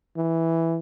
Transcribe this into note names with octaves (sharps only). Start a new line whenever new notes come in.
E3